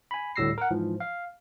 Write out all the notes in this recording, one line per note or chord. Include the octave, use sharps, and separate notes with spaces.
G#5 B5
D2 A2 G3 E6 A#6 C7
A#4 F#5
G#2 E3 F3
F5